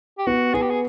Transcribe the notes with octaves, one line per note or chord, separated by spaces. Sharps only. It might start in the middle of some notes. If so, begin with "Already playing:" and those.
G4
B3 F#4
B3 G#4
G4
G#4